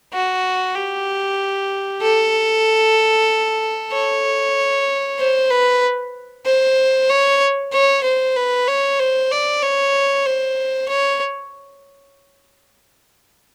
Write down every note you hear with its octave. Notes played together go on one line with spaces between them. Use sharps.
F#4
G4
A4
C#5
C5
B4
C5
C#5
C#5
C5
B4
C#5
C5
D5
C#5
C5
C#5